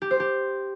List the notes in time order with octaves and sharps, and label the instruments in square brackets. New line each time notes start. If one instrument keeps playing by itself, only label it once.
[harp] G4
C5
G4